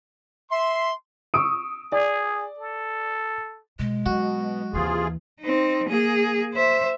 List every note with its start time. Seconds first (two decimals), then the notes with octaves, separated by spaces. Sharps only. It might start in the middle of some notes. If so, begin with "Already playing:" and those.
0.51 E5 C6
1.34 C#6 D#6 E6 D7
1.92 G#4 D5
2.59 A4
3.79 B2 G#3
4.06 B2 F#3 F#4
4.73 D#2 C3 E3 F4 G#4
5.41 C4 D#4
5.88 A#3 G#4
6.53 C5 E5